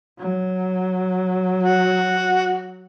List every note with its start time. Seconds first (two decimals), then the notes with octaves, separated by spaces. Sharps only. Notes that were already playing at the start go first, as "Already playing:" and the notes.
0.19 F#3
1.62 F#4